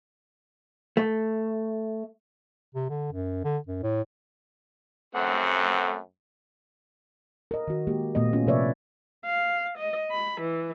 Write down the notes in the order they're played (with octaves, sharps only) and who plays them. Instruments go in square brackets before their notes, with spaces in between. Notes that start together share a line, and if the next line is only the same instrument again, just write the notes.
[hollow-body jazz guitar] A3
[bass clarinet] C3
D3
F#2
D3
F#2
A2
[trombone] F#2 [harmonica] A3 C4 F#5
[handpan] A#4 D#5
D#3 F#4
G#3 A#3 G4
A#2 A3 B3 D#5
C#4 F4
C3 F3 B4 C#5 D5 E5
[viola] F5
D#5
B5
E3